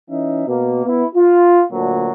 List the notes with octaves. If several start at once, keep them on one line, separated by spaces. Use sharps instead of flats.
E3 C#4 D#4 E5
B2 A#3
B3 E4
F4
D2 A#2 D3 F#3